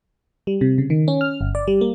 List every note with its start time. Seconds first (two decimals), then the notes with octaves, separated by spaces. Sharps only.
0.47 G3
0.61 C3
0.78 C#3
0.90 D#3
1.08 C#4
1.21 F6
1.41 G1
1.55 D5
1.68 G3
1.81 A#3